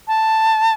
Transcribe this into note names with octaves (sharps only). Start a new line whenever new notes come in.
A5